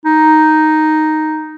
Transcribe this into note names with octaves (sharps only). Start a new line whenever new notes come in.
D#4